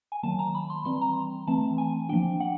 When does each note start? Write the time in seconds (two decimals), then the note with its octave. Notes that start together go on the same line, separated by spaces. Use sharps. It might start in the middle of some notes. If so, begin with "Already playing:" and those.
0.12 G#5
0.23 D#3 F#3 A#3 A5
0.39 A#5
0.55 B5
0.70 C6
0.85 E3 G3 C4 C6
1.01 A#5
1.47 E3 A3 C4 A5
1.78 G#5
2.09 F3 A#3 D4 G5
2.40 F#5